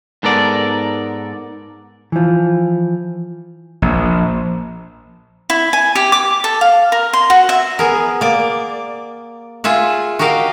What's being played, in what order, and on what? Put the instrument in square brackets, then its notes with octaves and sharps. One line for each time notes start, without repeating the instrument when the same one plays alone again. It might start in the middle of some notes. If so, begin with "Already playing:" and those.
[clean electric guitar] G#2 B3 A4 A#4 D5
[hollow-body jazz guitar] E3 F3
[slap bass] A#1
[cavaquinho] E4
G#5
G4
D6
A4
F5
A#4
C6
F#4
E5
[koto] B3 G#4 A#4
A#3 D5
F4 G#4 E5 F#5
F#4 G4 A#4 D#5 F5